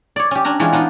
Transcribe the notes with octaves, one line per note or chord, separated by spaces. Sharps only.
C#5 D5
C#4 G4
C#4 D4 A#5
E3 G#3 C#4 F4
B3 D4 D#4 F4